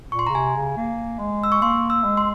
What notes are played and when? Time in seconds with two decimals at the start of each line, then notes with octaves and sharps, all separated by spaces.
0.12 A#2 C#6
0.19 C6
0.27 A#5
0.29 C#3
0.35 C3 G#5
0.56 C#3
0.77 A#3
1.19 G#3
1.44 E6
1.52 C#6
1.62 A#3 C6
1.90 E6
2.04 G#3
2.17 C6